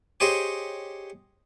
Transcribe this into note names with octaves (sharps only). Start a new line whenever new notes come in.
G4 G#4 C5 C#5 D#5